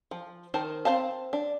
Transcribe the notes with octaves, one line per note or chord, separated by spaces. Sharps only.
F3
D#3 A#4 C5 A5
C4 D#4 C5 F5 A5
D4